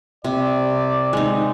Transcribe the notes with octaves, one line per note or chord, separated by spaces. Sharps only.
C3 D5
G#3 D#4